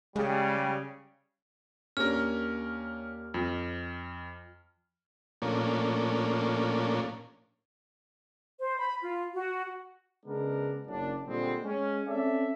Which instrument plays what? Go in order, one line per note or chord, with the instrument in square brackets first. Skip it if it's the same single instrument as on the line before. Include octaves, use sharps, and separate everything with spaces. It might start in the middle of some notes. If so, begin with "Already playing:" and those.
[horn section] C#3 G3 [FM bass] G#3
[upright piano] D#2 A#3 D4 [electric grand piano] C#4 A#4 [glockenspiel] F6
[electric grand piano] F2 [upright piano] F3
[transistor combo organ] A#2 F3 A3 A#3 C#4 D4
[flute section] C5
B5
F4
F#4
[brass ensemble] C#3 G#3 B3 D4 A#4
F#1 F#2 D4
A#2 D3 G3 G#3 C4
G#3 C#4
C4 C#4 A4 D5 E5